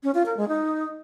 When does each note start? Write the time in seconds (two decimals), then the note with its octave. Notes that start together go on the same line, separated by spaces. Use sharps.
0.03 C#4
0.15 F4
0.26 A#4
0.37 G#3
0.48 D#4